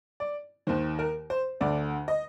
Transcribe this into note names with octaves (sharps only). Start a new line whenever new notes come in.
D5
D#2 D#3 C5
A#4
C5
D2 D3 D5
D#5